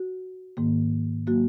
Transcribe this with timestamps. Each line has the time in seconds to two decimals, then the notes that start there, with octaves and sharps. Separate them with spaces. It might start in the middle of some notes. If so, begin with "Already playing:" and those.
Already playing: F#4
0.57 G#2 D#3 A#3
1.27 F#3 A#3 F#4